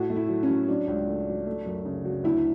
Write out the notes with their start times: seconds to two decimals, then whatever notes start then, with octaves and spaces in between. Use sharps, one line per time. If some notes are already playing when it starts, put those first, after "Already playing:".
Already playing: A2 F#4
0.10 A3
0.16 E4
0.29 F#3
0.43 C#4
0.49 F#3
0.68 F#3 D4
0.88 C#2
1.07 A3
1.27 F#3
1.46 A3
1.66 F#2
1.85 C#3
2.05 F#3
2.24 D2 E4